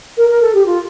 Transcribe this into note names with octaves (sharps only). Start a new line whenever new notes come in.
A#4
A#4
A4
G4
F4